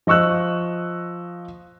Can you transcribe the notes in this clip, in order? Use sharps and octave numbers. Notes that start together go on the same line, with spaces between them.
F3 D#5 C#6 E6 F#6